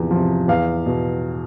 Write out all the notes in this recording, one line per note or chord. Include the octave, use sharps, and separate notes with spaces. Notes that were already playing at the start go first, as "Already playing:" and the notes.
Already playing: E2 C3 F3
F3
C3
E2 F5
B2